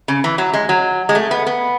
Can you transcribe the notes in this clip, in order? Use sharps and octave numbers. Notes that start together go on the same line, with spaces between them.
C#3
E3
F#3
G#3
F#3
G#3
A3
B3
B3